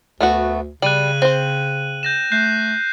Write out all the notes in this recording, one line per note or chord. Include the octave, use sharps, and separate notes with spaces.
D2 A3 B3 F#4
C#3 G3 F#6 D#7 F#7
C4 C5
G6 A#6 E7
A3 F#6 G6 C7